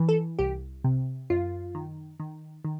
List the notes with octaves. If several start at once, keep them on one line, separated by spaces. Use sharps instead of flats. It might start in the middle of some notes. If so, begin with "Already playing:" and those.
Already playing: E3
A4
C2 G4
C3
F#2 F4
D#3
D#3
D#3